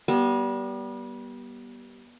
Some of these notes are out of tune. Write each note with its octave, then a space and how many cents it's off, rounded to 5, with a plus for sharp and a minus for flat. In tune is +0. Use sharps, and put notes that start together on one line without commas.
G3 -20 B3 -35 A#4 +0